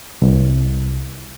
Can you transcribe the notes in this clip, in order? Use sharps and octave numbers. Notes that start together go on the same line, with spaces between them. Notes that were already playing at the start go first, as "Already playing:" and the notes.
C2